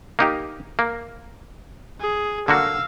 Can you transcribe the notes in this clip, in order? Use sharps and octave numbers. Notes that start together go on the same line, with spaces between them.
A#3 D#4 G4
A#3
G#4
D3 A#3 F#4 F5 E6